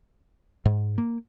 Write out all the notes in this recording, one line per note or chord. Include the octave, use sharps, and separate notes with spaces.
G#2
A#3